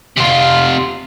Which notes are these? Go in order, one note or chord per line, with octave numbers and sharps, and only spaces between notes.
C3 F4